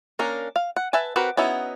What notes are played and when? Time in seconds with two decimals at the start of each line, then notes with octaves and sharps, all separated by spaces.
0.19 A#3 C#4 D4 A#4
0.56 F5
0.76 F#5
0.93 B4 E5 G#5 A5
1.16 C4 F#4 G4 A#4 B4
1.37 B3 C#4 D#4 E4 F#4